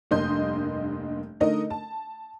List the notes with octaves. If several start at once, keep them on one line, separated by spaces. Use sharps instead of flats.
F1 G2 A#3 D#5 C6 G6
D3 A3 D#4 A#4 D#5
A5